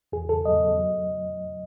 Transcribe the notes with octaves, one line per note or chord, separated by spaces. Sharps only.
E2 G#4
E2 A4
F#3 D#5
F#3
F#3